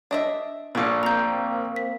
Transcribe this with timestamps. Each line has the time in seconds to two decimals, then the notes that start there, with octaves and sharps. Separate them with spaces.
0.11 D4 D#5 E5
0.75 A#1 A#2 G#4 A4
1.03 A#3 C4 A#5 G6
1.76 B6